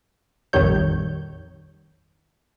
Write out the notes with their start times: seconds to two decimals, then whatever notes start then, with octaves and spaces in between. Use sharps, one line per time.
0.53 A#1 F2 D#3 G3 C#5 G6